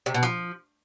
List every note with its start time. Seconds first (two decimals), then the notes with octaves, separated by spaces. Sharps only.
0.06 C3
0.14 B2
0.23 F3